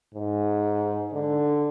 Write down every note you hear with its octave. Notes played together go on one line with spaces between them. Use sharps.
G#2
D3